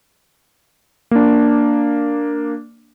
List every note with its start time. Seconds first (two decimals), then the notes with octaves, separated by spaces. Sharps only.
1.11 A#3 D4